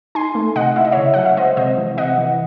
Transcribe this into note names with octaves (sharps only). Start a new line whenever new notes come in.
D#4 G#5 C6
A3
C3 D#5 F#5
E4 E5
D#5
C#3 C#5 E5
F#3 F#5
E5
G#3 C5 D#5
C3 C5 D#5
E3
C3 D#5 F#5
E3